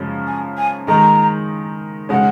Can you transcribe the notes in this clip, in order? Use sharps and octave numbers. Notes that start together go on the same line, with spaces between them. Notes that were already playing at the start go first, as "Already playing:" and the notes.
Already playing: F#2 C#3 F3 G#3 C#4
G#5
G#5
D#3 G#3 D#4 A#5
C#3 G#3 C#4 F#5